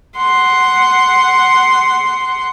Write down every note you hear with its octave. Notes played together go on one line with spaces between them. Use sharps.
F#5 C6